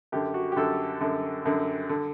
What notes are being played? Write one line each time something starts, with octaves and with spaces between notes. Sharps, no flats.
F#2 D3 G4
F#4
G4
F#2 D3 A4
F#2 D3
F#2 D3
D3